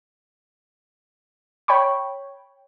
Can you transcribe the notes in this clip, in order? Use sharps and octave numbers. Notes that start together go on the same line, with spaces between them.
C#5 G5 B5 C#6